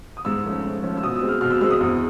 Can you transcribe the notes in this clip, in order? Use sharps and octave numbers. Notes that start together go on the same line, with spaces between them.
D#6
G#2 E6
F3 A3 C#4
G#2
F3 A3 C#4
E6
B2 D#6
E6
G#3 C4
F6
B2 F6
E6
G#3 C4 E6
D#6
E2